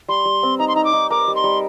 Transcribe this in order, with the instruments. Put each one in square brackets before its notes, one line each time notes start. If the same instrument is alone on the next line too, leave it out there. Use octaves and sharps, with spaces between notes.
[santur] G3 [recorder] C6
[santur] G3
C4
[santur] D#4 [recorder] A#5
[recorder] C6
[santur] D#4 [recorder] A#5
[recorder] D6
[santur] D#4
[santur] A#4 [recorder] D6
[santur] G3
[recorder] C6
[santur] G3